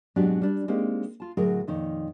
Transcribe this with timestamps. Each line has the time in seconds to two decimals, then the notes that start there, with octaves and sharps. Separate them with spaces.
0.16 G#2 B2 F#3 C4 D4 G4
0.42 G3 D4
0.68 G#3 A#3 C4 D#4 G4
1.20 F4 A5
1.37 D2 A2 F#3 G#4 A#4
1.67 F2 A#2 D#3 D#4 C#5